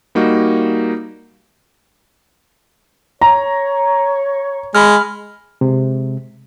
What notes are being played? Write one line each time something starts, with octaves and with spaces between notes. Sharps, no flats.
G3 A#3 D#4 F#4
C#5 A#5
G#3 B5 F6
C3 G#3